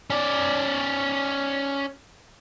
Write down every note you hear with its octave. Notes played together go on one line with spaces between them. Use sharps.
C#4 D5